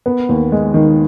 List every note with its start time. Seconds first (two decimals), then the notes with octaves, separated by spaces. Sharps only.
0.06 B3
0.29 D#2
0.52 G#3
0.74 D#3